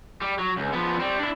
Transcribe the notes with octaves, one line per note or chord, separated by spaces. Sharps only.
G3
F#3
C#2
F3 B3
G3 C4
D4 E4